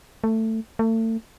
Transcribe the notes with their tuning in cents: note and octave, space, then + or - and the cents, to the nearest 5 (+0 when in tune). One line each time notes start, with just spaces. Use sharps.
A3 +15
A3 +35